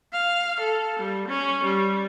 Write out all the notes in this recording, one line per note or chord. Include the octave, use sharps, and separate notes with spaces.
F5
A4
G3
C#4
G3